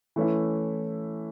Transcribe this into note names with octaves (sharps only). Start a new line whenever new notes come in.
E3 A3 C#4 E4